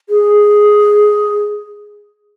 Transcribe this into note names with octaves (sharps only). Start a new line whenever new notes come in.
G#4